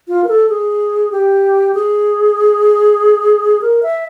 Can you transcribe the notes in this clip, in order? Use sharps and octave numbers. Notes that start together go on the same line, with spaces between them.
F4
A#4
A4
G#4
G4
G#4
A#4
E5